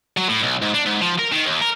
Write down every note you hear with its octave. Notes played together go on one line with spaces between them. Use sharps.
F#3
A2
B1
G#2
D4
G#2
F3
A#4
D#3
D#2
A#4